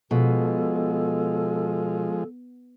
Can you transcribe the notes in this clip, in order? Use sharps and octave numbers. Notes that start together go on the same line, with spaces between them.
B2 F3 G#3 A4